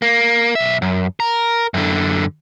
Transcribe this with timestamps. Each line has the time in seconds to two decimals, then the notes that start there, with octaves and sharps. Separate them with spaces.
0.02 A#3
0.55 B1 E5
0.82 F#2
1.20 A#4
1.74 F#2 D3